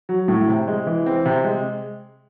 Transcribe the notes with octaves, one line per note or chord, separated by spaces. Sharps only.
F#3
A2
C3
G#3
E3
C4
C3
G#3